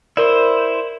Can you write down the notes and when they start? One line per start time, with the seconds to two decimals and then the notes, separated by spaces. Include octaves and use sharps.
0.17 E4 A#4 C5 D5